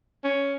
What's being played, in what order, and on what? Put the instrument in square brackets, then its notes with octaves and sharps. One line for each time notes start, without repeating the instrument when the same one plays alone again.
[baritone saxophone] C#4